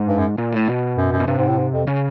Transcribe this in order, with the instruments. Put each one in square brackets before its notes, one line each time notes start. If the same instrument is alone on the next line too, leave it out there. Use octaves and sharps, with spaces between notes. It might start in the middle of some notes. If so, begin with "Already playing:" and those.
Already playing: [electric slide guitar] G#2
[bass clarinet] G2
F#2
[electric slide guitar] A#2
A2
B2
[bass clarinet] F#2
F#2
[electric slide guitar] B2
[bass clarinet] G2 [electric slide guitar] C3
[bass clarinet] G#2
A2
G#2
F2
[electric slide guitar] C#3